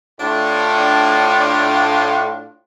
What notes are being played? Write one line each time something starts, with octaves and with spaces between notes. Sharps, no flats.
A2 D4 F4